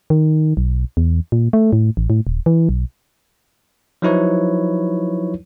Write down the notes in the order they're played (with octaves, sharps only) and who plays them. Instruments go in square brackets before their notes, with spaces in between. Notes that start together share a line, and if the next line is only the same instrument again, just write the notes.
[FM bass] D#3
B1
E2
A#2
A3
A2
A1
A2
D#1
E3
B1
[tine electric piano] F3 F#3 D#4 E4 B4 C#5